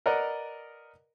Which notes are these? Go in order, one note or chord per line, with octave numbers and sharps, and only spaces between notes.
A#4 B4 D5 D#5 F#5 A#5